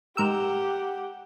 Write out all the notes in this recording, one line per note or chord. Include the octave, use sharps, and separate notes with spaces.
G#2 G4 A#4 F#5 E6